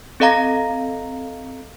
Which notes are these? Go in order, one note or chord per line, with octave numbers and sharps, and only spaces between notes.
C4 A4 D#5 F5 A#5 A#6